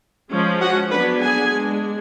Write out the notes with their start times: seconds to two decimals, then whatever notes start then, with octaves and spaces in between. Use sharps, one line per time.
0.31 F3 G#3 C#4
0.61 F#4 F#5
0.90 F#3 B3 D4 B4 B5
1.20 G#4 G#5
1.50 G#3 D4